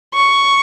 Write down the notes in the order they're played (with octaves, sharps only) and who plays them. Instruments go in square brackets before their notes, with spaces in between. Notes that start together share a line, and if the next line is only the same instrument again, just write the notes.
[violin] C#6